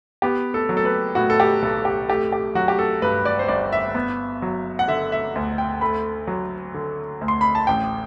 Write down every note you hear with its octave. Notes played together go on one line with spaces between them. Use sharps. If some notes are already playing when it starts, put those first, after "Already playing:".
B3 G4
A4
F#3
A4
B4
A2 F#4
A4
G4
B1 A4
G4
A3 G4
G4
F#3 F#4
G4
A4
G2 B4
D5
C5
G1 D5
E5
B3
F#3
F#5
D3 E5
E5
D2
G5
A3 B5
F#3
D3
D2
C6
B5
A5
A1 G5